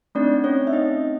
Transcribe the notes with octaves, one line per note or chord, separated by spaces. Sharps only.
A3 C4 D4 D#4 D5
C#4 C#5
E5
D#4 D#5